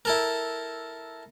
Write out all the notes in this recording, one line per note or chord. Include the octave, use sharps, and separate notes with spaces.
E4 A4 A#4